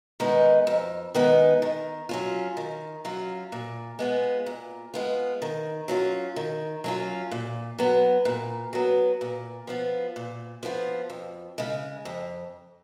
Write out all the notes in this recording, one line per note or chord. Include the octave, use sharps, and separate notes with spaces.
D#3 G#3 B3 D#4
F2
D#3 G#3 B3 D#4
D#3
F#3 C#4 F4
D#3
F#3 C#4 F4
A#2
G#3 B3 F4
A#2
G#3 B3 F4
D#3
F#3 C#4 F4
D#3
F#3 C#4 F4
A#2
F#3 B3
A#2
F#3 B3
A#2
F3 B3 F4
A#2
F3 B3 F4
F2
C#3 G#3
F2